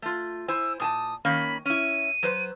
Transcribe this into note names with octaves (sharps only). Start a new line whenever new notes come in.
A3 F4
E4 C5 G#5 E6
A#2 G#5 A5 D#6
D#3 A#3 C#4 B5
C#4 E4 D#7
F#3 B4 C5